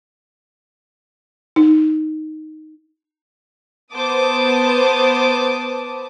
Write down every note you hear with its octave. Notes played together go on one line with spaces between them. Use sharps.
D#4
B3 B4 C5 A5 D6 D#6